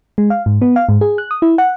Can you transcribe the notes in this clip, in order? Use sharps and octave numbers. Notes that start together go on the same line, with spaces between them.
G#3
F5
G#2
B3
F5
G#2
G#4
F#6
D#6
E4
F#5